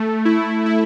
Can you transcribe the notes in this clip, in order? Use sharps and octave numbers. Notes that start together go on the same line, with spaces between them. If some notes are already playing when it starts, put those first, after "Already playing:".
Already playing: A3
E4
E4